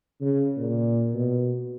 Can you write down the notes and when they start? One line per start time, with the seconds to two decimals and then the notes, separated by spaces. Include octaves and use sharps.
0.21 C#3
0.57 A#2
1.14 B2